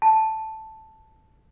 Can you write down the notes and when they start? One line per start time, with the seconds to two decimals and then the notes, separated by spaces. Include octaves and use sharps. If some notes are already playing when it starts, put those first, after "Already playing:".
0.02 A5